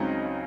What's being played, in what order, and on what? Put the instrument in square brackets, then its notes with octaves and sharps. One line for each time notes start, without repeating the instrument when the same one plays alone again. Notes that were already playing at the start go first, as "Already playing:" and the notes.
Already playing: [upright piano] C#2 C#3 F#3 C4 D#4 D#5